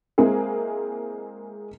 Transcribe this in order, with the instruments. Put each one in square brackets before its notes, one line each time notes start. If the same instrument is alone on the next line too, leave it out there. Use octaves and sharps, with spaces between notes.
[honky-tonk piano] G#3 A#3 C4 E4 G#4